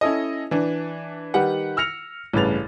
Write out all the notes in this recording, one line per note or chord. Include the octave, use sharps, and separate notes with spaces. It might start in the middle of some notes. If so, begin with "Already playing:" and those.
C#4 E4 A4 D#5
E3 D4
D#3 G3 G4 B4 F#5
E6 F6 A#6 C#7 F7
A1 G2 C#3 B4 A6 F7